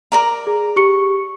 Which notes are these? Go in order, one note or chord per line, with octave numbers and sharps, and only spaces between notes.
A#4 D5 A#5
G#4
G4 C#6 C#7